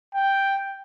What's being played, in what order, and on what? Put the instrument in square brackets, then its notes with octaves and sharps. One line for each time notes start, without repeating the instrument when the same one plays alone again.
[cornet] G5